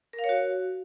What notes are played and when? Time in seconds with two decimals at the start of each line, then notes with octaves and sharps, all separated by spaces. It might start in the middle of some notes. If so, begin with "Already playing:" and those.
0.13 A#4
0.19 F5
0.24 C#5
0.29 F#4